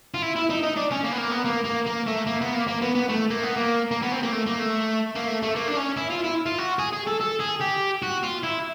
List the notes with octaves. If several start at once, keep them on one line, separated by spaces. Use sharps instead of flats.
F4
E4
E4
D#4
D#4
D4
C#4
A#3
B3
A#3
B3
A#3
A#3
A#3
A3
A#3
B3
A#3
A#3
B3
B3
A3
A#3
B3
A#3
A#3
B3
C4
A#3
A3
A#3
A3
A#3
A3
A3
A#3
D4
C#4
E4
F4
E4
F4
F#4
G#4
G#4
A4
A4
G#4
G4
F#4
F4
E4